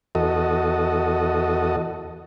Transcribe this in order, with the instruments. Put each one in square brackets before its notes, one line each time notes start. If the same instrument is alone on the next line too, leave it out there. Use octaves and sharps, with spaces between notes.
[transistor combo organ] E2 F#4 A4 D#5